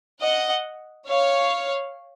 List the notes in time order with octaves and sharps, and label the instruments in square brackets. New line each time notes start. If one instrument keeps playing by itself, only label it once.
[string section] D#5 F#5
C#5 F5